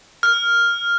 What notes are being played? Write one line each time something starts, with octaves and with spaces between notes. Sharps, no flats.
F6